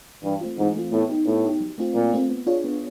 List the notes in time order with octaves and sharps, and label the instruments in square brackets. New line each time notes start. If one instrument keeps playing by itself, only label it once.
[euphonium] G2 [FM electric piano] E3
[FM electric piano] A3 C4 F4
[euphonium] G#2 [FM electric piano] E3
[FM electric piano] A3 C4 F4
[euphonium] A2 [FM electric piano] B3
[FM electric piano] D#4 G4
[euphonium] A2 [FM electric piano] B3
[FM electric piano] D#4 G4
F#3
A3 C4 F4
[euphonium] A#2 [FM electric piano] F#3
[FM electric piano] A3 C4 F4
B3
D4 F4 G#4 C#5
B3